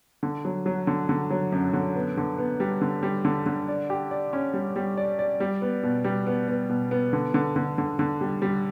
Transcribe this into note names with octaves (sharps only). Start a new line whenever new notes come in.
D3
F#3
F#3
D3
D3
F#3
F#2
D3
B3
D3
B3
G3
D3
G3
D3
D3
D5
G4
D5
C#4
G3
G3
D5
D5
G3
B3
B2
G3
B3
B3
B2
B3
D3
D3
D3
D3
D3
G3
G3